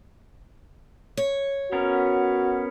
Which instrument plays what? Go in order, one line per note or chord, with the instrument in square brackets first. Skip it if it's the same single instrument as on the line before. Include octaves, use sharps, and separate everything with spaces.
[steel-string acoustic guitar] C#5
[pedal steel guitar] B3 C#4 A#4 [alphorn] F#4